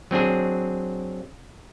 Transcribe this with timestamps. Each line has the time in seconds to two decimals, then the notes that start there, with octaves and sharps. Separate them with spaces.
0.11 F#3 C4 D4 G#4